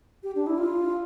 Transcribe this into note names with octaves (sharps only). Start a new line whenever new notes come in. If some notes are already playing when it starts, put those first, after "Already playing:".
G4
D4
E4
F4